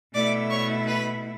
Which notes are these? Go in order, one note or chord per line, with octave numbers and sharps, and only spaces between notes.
B2 A3 E4 D5 D6
C#5 C#6
B4 B5